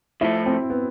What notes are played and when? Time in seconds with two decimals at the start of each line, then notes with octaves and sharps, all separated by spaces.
0.21 A2 F3 A3 E4
0.46 C4
0.70 B3